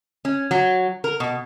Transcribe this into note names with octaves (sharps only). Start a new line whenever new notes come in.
C#4
F#3
A#4
B2